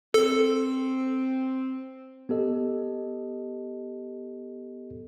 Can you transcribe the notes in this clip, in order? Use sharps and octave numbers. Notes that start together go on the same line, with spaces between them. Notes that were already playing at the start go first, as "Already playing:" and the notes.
C4 A4
B3 G4 A4 D#5